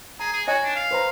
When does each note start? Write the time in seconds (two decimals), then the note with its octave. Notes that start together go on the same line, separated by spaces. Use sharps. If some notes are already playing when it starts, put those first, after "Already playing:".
0.20 G#4 A#5
0.33 G#4
0.48 F#4 C#5 D#5 G#5
0.64 D4
0.76 F5
0.91 B4 C5 A#5